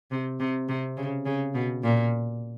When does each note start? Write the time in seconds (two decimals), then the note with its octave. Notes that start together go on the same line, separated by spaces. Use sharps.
0.11 C3
0.40 C3
0.69 C3
0.97 C#3
1.26 C#3
1.54 B2
1.83 A#2